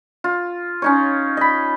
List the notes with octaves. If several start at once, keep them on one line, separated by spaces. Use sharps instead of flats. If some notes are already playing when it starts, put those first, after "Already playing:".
F4
C#4 D#4 C#5
D#5 B5